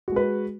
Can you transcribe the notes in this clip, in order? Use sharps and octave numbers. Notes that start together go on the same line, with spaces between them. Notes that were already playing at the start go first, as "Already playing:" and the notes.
G#3 F#4 B4